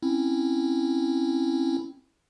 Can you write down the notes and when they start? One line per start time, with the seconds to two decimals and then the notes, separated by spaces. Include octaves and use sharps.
0.02 C4 C#4 E4